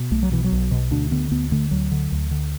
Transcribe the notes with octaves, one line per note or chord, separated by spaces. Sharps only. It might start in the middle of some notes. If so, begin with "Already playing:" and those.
Already playing: B2
B1 A3
F#3
B2 E3
F#3
B1
B2
D2 D4
D3 B3
D2 B3
D3 A3
D2 F#3
D3
D2
D3